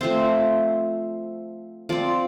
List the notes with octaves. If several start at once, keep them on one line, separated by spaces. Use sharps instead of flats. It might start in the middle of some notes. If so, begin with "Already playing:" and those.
F3 A3 C4 C5
F3 C4 D5